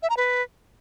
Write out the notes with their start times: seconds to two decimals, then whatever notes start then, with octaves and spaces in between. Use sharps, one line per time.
0.02 E5
0.10 A#5
0.17 B4